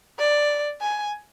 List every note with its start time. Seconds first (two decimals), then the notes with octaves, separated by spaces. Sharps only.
0.19 D5
0.81 G#5